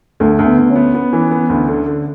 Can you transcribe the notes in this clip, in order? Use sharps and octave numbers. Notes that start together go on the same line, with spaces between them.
D2 A3
D2
B3
D2
C#4
B3
B3
E3
B3
D2
D3
D3